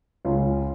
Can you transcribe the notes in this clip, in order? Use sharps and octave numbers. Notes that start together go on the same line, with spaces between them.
C#2 C#3 G#3 C#4 F4